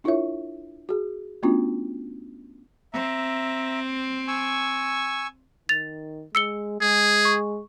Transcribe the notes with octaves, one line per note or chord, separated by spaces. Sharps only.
D4 E4 F4 A#4 C#5 E5
F#4 G#4
A3 B3 C#4 D4 F4 F#4
C4 E5 A#5
G#5 C#6 E6
D#3 A6 F7
G#3 E6 C#7 G7
G#3 G#4
C#6